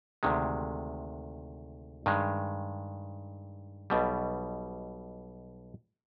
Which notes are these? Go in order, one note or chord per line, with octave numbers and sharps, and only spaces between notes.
D2 C3 D#3 G#3
G2 D#3 G#3
B1 B2 G3